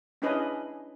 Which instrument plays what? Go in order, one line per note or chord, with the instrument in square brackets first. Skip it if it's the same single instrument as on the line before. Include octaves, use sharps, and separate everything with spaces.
[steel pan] C#4 D4 E4 G#4 B4 D#5